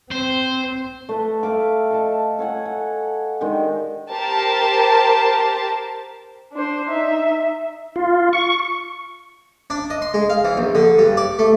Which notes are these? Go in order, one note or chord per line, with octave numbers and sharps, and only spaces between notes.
C4 C5
A3 B4
A3 E5 F5 D6
A4 D#5 A5
A4 C#5 F#5 G#5
F#5
D#3 G#3 D4 G4
G4 A#4 C5 A5
D4 C5
D#4 E5
F4
C#6
D4
D#5
C6
G#3
F5
E3
A#1
D3
G2
D5
A3